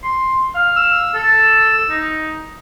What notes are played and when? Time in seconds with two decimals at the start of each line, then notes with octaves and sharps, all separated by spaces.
0.04 C6
0.55 F5
0.77 E6
1.15 A4
1.90 D#4